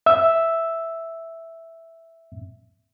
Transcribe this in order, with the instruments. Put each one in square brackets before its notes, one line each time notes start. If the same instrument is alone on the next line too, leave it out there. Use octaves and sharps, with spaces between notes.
[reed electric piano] E5 E6